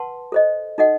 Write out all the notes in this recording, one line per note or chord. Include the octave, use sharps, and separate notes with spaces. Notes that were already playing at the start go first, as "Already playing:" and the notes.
Already playing: B4 F#5 A5 C6
A4 C5 D#5
D#4 A4 D#5 F#5